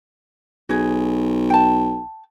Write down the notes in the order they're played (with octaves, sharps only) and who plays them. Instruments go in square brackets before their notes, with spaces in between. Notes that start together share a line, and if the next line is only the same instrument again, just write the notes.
[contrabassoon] B1 [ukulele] F#4 G#4
[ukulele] G5 A5